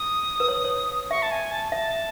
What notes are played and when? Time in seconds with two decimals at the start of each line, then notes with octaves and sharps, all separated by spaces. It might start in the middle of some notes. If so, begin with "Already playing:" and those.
Already playing: D#6
0.40 B4
0.48 C#5
0.64 C#5
1.11 E5 C#6
1.22 A5
1.31 G#5
1.52 A5
1.72 E5 A5